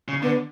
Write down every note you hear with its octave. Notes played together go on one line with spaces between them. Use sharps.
C#3
D3 B3